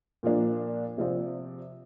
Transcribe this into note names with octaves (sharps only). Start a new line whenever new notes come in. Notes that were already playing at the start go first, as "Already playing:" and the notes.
A#2 F3 A#3 D4
C3 F3 C4 F4 D5